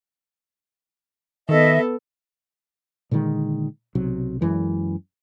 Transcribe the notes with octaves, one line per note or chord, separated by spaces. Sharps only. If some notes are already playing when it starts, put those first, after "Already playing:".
D#3 B3 A4 D#5 E5
A#2 D3 D#3 G#3
B1 C3 F#3
F#2 E3 G#3